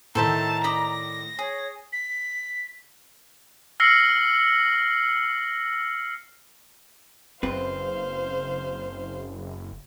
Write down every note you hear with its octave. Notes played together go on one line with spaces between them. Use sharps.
A2 D#3 A4 C5 E5 A5 A#5
D5 D#5 B5 A#6
G#4 C#5
B6
E6 F6 A#6 C7 C#7 F#7
F#1 C4 B4 C5 F5